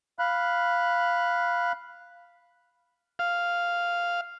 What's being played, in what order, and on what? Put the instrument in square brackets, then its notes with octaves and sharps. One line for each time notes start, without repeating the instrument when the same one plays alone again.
[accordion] F5 B5 F#6
[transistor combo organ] F5